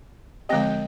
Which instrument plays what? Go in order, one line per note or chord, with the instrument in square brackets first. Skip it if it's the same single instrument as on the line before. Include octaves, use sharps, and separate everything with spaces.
[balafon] D3 F3 G#3 C4 G4 [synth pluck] D#5 G5